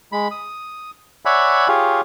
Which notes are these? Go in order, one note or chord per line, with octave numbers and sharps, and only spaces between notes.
G#3 B5
D#6
C#5 D5 E5 F#5 G#5 B5
F4 G4 G#4 C#5 F5